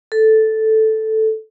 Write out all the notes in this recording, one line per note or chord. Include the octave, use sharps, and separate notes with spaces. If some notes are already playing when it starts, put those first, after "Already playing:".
A4